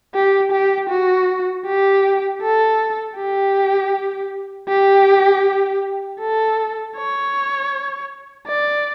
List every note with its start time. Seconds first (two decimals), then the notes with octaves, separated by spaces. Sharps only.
0.15 G4
0.52 G4
0.90 F#4
1.66 G4
2.41 A4
3.17 G4
4.68 G4
6.20 A4
6.96 C#5
8.48 D5